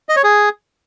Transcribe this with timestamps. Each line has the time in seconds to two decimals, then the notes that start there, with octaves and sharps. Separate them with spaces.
0.09 D#5
0.16 C#5
0.24 G#4